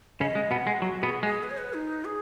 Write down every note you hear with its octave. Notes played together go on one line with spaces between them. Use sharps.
C#3 C#4 D#5
G#3
B2 B3 F#5
G#3
F#3 F#4
B2 B3 G#4
G#3 G#4
B4
C#5
B4
D#4
G#4